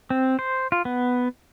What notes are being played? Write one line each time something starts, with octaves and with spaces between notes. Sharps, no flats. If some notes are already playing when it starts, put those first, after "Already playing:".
C4
C5
F4
B3